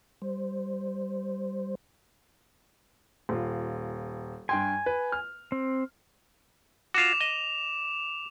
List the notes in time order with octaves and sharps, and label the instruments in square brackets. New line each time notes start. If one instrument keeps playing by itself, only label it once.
[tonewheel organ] G3 C5
[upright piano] D#1 F4
[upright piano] G2 G5 C6 [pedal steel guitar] G#5
[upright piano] B4
F6
[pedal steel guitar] C4
[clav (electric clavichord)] F4 F#4 [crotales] D6 E7 F7
[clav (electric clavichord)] D#5